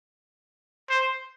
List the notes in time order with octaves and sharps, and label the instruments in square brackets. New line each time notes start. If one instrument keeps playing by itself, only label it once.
[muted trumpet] C5